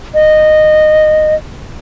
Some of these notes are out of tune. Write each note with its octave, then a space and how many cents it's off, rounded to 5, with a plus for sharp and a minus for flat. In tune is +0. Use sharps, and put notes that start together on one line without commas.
D#5 -15